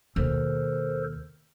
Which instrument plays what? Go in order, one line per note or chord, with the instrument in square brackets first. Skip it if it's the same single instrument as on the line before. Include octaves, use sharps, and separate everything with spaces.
[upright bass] D#2 B2 [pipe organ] A4 A#4 C5